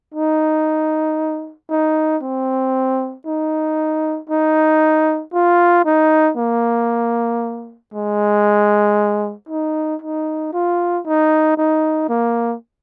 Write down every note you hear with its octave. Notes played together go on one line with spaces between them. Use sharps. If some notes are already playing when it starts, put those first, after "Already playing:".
D#4
D#4
C4
D#4
D#4
F4
D#4
A#3
G#3
D#4
D#4
F4
D#4
D#4
A#3